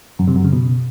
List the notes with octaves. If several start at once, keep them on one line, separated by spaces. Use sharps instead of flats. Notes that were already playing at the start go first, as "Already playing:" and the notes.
F#2
C3
F#2
C#3
B2